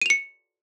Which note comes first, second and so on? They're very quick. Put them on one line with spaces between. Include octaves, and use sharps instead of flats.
D#7 F7 C#7